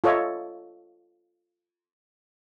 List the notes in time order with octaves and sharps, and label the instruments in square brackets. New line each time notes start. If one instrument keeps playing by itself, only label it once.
[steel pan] F4 A4 C#5 D#5 E5